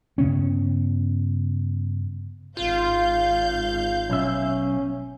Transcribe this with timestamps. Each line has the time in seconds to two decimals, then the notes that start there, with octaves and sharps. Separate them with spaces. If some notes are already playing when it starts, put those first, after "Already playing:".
0.18 G2 C#3 B3 C#4
2.57 G#1 F4 F5 G6
4.10 B1 C#4 E5